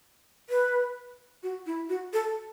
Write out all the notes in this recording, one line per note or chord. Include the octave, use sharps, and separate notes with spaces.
B4
F#4
E4
F#4
A4